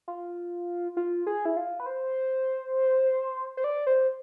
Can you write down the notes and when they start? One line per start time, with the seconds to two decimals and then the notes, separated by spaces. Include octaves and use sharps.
0.08 F4
0.97 F4
1.27 G#4
1.45 E4
1.57 F4
1.80 B4
1.86 C5
3.57 C5
3.64 D5
3.87 C5